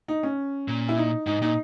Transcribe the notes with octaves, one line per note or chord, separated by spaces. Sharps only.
D#4
C#4
A#2
E4
D#4
G#2 D#4
A#2 D#4